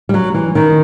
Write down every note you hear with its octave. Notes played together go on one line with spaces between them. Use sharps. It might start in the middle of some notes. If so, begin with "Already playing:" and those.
G3
F#3
E3
D#3